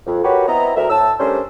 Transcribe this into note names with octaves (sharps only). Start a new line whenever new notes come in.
F2
F#4 G4 A#4 B4 C#5
B3 C4 E4 D#5 A#5
D2 A#4 E5
A2 A5 E6
G3 A3 C#4 D4 A#4 C5